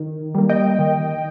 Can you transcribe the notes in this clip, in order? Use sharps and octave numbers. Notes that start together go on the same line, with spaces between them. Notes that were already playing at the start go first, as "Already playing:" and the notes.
Already playing: D#3
G3 A#3
D#5 G5
D#3